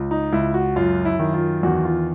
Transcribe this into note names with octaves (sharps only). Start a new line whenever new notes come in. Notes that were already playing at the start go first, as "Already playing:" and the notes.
Already playing: C#2
D#4
C#2 E4
F#4
F#2 F4
E4
D#3
F4
E2 F#4
F4